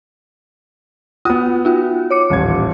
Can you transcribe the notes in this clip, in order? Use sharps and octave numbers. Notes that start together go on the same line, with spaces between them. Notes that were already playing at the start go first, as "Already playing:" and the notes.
B3 F4 F#4 D#6
D#4 F4 F#4
C#5 D6 C#7
D#1 A1 G#6